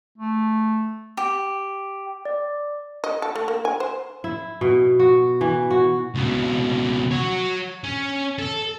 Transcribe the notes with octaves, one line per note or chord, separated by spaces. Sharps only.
A3
G4
D5
D#5
A4
A3
A#3
G#5
C5
E4
B2
F#4
E3
F#4
C#2 B2
F#4 C#5
C#4
A4